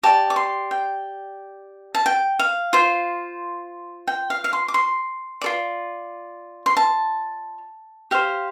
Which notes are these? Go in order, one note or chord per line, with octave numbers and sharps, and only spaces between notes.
G4 D5 A5
D6
C6
G5
A5
G5
F5
F4 C5
G5
F5
F5
C6
D6
C6
F4 A4 D5
C6
A5
G4 C5 F5